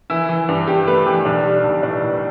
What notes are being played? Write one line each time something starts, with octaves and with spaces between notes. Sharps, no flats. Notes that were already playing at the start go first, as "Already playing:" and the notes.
E3 E4
E3
G2
G2 G4
A3 B4
E3 G4
B1 D4
G3
B1
A2 D4
A2